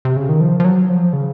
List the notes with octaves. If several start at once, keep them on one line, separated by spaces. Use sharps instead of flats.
C3
C#3
D#3
F3
F3
F#3
F3
C#3